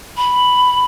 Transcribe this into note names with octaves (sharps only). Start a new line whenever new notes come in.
B5